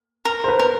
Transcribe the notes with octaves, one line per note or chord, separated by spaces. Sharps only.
A#4
C5
B4
A#4